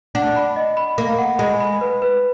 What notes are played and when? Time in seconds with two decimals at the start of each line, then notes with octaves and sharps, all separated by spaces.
0.15 D4 F#5
0.36 B5
0.56 D#5
0.77 B5
0.98 A#3 B5
1.18 F#5
1.39 G#3 B5
1.60 B5
1.81 B4
2.02 B4